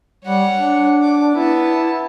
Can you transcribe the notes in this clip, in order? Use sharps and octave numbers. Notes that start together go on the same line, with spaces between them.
G3 C#5 F#5
D4
D6
B3 E4 A5